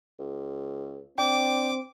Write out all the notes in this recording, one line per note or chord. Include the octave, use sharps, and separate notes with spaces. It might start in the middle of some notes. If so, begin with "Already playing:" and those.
C#2
C4 D4 G5 D6